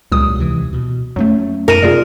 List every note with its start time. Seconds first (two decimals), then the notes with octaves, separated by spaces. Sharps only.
0.12 C#2 A#2 F#3 G3 D#6
0.37 D#2 C3 E3
0.73 B2
1.16 F2 F#3 A3 C#4
1.68 F#2 D#4 A#4 D#7
1.83 C3 F#3 A#3 F4 G#4 D5